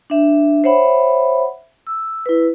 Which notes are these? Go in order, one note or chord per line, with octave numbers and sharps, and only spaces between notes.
D4 E5
C5 C#5 E5 F#5 B5
E6
E4 B4